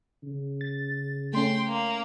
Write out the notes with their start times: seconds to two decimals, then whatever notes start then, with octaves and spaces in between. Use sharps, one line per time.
0.23 C#3
0.61 A6
1.33 A3 C#4 G5 C6
1.67 A#3